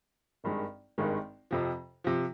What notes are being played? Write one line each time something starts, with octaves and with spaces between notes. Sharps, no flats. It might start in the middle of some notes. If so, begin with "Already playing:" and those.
G#1 G2 D#3 G#3
G#1 G2 D#3 G#3
F2 C3 F3
C3 F3